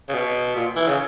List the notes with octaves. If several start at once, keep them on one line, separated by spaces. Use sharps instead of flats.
C#3
B2
A#2
E3
C#3